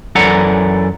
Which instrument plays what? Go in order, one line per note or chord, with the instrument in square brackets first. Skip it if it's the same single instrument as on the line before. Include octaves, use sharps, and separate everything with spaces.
[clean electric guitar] F#2 E3 A4 D5 F#5 A#5